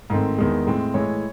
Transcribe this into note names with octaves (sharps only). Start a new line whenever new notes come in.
G#2 D#3 A3 C4
E2 D#3 G#3
A2 G#3 C4
A2 E3 G#3 C#5